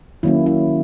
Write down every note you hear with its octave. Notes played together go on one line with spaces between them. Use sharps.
D#3 F#3 A#3 C#4 E4
E4